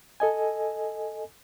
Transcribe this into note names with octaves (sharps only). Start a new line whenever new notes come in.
A4 D#5 G#5